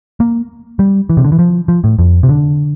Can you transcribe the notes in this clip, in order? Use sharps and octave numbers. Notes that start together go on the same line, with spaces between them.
A#3
G3
E3
C3
D3
E3
F3
F3
A2
F2
C3
D3